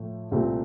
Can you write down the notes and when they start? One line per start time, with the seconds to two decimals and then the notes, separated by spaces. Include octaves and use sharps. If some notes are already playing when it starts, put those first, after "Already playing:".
Already playing: A2 F3 A3
0.31 C2 A#2 A3 C4